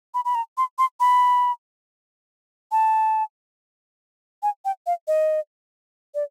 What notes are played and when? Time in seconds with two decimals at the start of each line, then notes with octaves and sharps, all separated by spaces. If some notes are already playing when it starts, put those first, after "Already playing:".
0.14 B5
0.25 B5
0.35 A#5
0.58 C6
0.78 C6
1.00 B5
2.72 A5
4.43 G#5
4.65 G5
4.86 F5
5.08 D#5
6.15 D5